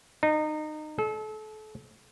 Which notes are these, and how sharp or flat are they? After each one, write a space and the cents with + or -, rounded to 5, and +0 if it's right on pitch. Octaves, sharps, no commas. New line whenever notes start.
D#4 -25
A4 -35